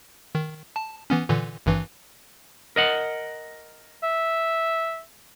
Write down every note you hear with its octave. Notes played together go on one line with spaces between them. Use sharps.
D#3
A5
E3 B3 C#4
A#2 D3 E3
G#1 G2 E3
A#4 D#5 F#5
E5